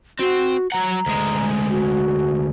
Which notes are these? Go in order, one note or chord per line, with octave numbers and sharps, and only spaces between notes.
C4 F#4 C5
F#3 F#5 A#5
D2 G#3
F#4